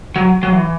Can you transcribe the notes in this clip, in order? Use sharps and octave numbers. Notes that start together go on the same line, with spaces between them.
F#3
F#3
E3